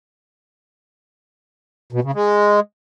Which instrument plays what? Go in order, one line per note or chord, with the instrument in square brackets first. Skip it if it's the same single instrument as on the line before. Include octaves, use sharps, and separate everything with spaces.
[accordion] B2
C#3
G#3